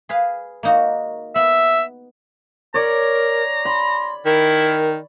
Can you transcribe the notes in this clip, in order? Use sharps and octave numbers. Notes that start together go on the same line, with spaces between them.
G#4 B4 F5
A#3 D#4 F#4
B3 E5
A#4 C#5 D5 A#5
B5 C6
D#3 E4 A#4